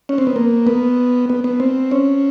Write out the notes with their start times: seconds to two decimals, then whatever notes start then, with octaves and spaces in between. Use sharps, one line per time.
0.09 C#4
0.18 C4
0.27 B3
0.36 A#3
0.67 B3
1.30 B3
1.44 B3
1.60 C4
1.91 C#4